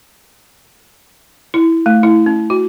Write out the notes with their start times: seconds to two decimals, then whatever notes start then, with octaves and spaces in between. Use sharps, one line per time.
1.54 E4
1.86 A3
2.03 E4
2.26 C#4
2.50 F#4